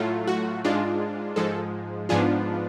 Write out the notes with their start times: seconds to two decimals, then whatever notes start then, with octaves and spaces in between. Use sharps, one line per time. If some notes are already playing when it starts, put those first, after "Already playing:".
Already playing: A2 F#3 A3 F4
0.27 F#4
0.64 G#2 G#3 D4 F4
1.36 G#2 F3 G#3 A4
2.09 G#2 F3 B3 D4 F4 G#4